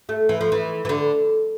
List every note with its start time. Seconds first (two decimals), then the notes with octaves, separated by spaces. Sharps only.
0.09 A3
0.29 E3
0.41 F3
0.52 E3
0.85 E3
0.89 D3